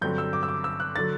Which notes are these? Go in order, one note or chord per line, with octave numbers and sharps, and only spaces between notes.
G2 D3 F#3 C4 G6
E6
D6
E6
D6
E6
F#6
D3 F#3 A6